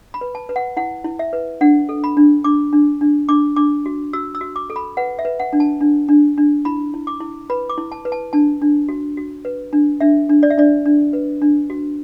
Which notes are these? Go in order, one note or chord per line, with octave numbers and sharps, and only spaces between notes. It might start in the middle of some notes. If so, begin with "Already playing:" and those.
B5
B4
A5
B4
F#5
E4 F#5
E4
E5
B4
D4 F#5
A4
B5
D4
D4 D6
D4
D4
D4 D6
D4 D6
F#4
F#4 E6
E6
F#4
D6
A4
B5
B4 F#5
E5
B4
F#5
D4
A5
D4
D4
D4
E4 B5
E4
D6
E4
B4 B5
D6
E4
A5
B4
A5
D4 A5
D4
F#4
F#4
B4
D4
D4 E5
D4
D5
E5
D4 D5
D4
B4
D4
F#4